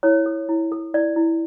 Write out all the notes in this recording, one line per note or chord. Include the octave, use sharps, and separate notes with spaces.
E4 C#5
A4
E4
A4
E4 D5
E4